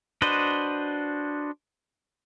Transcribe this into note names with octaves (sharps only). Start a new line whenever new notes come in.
D4 F#4 B4 C5 D#5